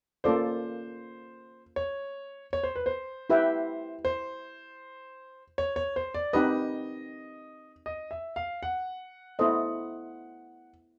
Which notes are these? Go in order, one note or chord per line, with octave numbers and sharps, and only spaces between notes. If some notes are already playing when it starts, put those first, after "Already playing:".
A#3 C#4 F4 A4 C5 D5
C#5
C#5
C5
B4
C5
E4 G4 B4 E5 G5
C5
C#5
C#5
C5
D5
C4 D#4 G4 B4 D#5
D#5
E5
F5
F#5
B3 E4 A4 C5 D#5